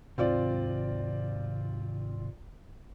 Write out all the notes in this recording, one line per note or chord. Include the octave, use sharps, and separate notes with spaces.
G#2 C3 D#3 C4 F4 D5